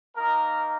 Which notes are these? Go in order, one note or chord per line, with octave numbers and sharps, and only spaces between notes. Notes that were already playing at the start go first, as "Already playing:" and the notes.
A#3 D#4 A#4